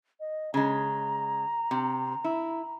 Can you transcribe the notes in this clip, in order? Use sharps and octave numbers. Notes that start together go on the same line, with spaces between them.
D#5
C#3 G#3 A#5
C3
E4